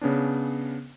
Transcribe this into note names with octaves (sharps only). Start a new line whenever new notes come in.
C#3 B3 C#4 D4